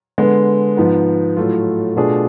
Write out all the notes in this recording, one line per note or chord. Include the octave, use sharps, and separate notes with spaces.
D3 G#3 B3
G#2 F3 B3
A2 F#3 A3 F4
B2 A3 D4 F4 G#4